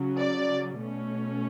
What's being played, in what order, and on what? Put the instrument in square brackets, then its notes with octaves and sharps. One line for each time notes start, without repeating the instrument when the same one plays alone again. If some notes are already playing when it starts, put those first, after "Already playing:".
Already playing: [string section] C#3 F#3 C#4
D5
B2 A3 C#4